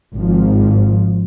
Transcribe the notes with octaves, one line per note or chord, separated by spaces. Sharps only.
G#1 F3